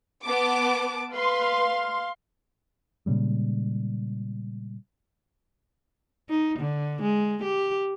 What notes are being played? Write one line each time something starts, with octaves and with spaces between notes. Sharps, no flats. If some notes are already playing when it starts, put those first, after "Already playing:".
B3 A5 D6
B4 F5 C6
A#2 C#3 G3 G#3
D#4
D3
G#3
G4